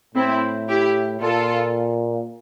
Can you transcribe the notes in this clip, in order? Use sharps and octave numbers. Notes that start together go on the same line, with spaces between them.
A2 C4 E4
E4 G4
A#2 F4 A4